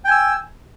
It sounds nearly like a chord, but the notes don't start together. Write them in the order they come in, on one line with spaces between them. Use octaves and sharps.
G5 G#5 E6